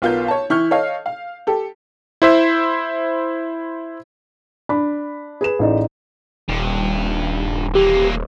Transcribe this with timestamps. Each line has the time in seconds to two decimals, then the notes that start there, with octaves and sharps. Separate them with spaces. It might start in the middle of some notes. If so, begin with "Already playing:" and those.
0.02 B1 B3 F4 A#4 G6
0.28 C#5 A5
0.50 E3 E4 C#6 F6 G6
0.71 A4 C#5 D#5 F5
1.06 F5
1.47 G4 A4
2.22 E4 C5 E5
4.69 D4 B5
5.41 G#4 B4 E7
5.59 A1 D#4 D5
6.49 D#1 G2
7.75 E3 A#3 G4